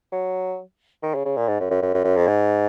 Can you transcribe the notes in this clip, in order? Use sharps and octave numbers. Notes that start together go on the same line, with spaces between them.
F#3
D#3
C#3
C#3
A#2
G#2
F#2
F#2
F#2
F#2
F#2
F2
G#2